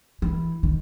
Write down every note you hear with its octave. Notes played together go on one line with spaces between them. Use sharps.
E3
D#3